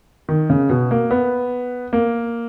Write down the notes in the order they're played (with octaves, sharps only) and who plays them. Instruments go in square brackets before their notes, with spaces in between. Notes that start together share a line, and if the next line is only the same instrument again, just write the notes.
[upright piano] D#3
C#3
B2
A#3
B3
A#3